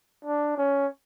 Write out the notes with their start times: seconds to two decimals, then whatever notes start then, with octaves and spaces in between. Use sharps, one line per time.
0.24 D4
0.57 C#4